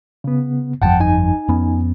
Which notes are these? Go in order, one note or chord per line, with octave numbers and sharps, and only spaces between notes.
C#3 B3
G1 F2 F3 F#5 G5 A5
D#4 G#5
F2 B3 C#4